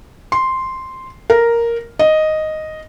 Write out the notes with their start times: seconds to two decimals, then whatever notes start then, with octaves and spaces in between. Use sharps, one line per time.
0.32 C6
1.30 A#4
1.99 D#5